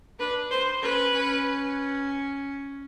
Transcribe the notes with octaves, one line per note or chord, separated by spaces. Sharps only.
D4 B4
C5
C#4 B4
C#4